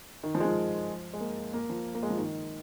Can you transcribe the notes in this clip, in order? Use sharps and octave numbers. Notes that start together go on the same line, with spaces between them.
D#3
F3
G#3
F3
G#3
A#3
A#3
F3
A#3
G#3
F3
D#3